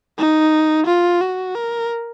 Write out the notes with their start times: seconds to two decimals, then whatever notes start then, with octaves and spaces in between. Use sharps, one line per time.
0.18 D#4
0.87 F4
1.21 F#4
1.55 A#4